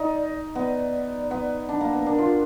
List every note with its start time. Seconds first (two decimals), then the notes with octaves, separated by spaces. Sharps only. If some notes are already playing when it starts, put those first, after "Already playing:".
Already playing: D#4 D5
0.55 B3 D5
1.31 B3
1.69 D4
1.81 A#3
1.93 B3
2.06 D4 A#4
2.18 F4